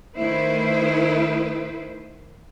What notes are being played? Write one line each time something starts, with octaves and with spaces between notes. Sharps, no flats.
D#3 A3 E4 B4 C5